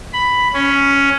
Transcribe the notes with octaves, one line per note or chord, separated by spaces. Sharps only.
B5
C#4